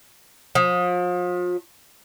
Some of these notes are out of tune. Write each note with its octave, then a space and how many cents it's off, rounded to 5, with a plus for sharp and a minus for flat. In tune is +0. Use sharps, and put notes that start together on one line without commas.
F3 +35